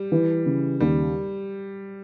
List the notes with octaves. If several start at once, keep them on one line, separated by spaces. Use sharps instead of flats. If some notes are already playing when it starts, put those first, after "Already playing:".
Already playing: G3
E3
C#3
D#2 G3